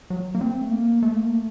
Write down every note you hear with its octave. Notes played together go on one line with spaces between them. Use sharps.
F#3
A#3
C4
A3
A#3
A3
A#3
A3